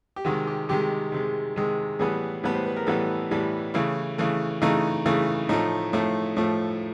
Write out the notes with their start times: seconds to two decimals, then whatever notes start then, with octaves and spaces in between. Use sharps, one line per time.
0.16 G4
0.25 C3 D#3 G#3 F#4
0.47 G4
0.69 C3 D#3 G#3 G4
1.12 C3 D#3 G#3
1.56 C3 D#3 G#3
1.99 A2 E3 G3 B3 G#4
2.44 A2 E3 G3 B3
2.55 C5
2.65 B4
2.76 A#4
2.87 A2 E3 G3 B3 A4
3.31 A2 E3 G3 B3
3.74 C#3 E3 A3 E4
4.18 C#3 E3 A3
4.62 C#3 E3 A3 D#4
5.06 C#3 E3 A3
5.49 A2 F3 A3 D#4
5.93 A2 F3 A3
6.37 A2 F3 A3